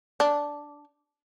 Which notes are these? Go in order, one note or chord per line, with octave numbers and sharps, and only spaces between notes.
D4